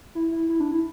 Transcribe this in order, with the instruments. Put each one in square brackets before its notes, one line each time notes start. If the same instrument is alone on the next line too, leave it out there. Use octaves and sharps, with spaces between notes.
[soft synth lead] E4
E4
E4
D4
E4